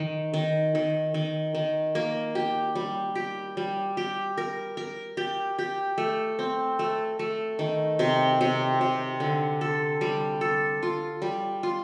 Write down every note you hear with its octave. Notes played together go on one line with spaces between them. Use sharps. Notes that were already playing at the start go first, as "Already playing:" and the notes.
Already playing: D#3
D#3
D#3
D#3
D#3
A#3
G4
G3
G4
G3
G4
A#4
A#4
G4
G4
A3
C4
A3
A3
D#3
C3
C3
C3
D3
A4
G3
A4
F4
G3
F4